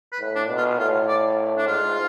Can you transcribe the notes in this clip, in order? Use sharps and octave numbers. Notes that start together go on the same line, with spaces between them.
B4
A2
D4
B2
F4
A2 F4
D5
D4
G#2 F4